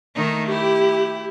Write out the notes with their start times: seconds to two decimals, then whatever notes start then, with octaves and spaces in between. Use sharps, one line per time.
0.16 D#3 A3 D#4
0.49 E4 G4